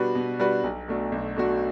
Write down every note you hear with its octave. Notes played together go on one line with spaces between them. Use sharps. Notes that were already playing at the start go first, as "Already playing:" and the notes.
Already playing: B2 G3 D4 F#4 B4
B2
G3 D4 F#4 B4
B1
B2 A3 D4 F#4
B1
B2 A3 D4 F#4